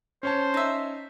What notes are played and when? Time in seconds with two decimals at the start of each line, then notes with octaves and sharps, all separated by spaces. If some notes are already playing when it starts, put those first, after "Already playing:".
0.23 C#4 C5 C#5 A5
0.54 D#4 E5